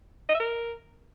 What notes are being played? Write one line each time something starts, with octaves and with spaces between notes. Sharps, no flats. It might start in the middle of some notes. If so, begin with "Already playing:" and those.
D#5
E5
A#4